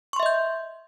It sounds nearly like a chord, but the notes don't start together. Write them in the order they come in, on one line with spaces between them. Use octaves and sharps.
C#6 C6 E5 D#5 G6